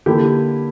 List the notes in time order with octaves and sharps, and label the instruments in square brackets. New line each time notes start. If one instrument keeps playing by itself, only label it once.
[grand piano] D3 A#3 E4 [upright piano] G4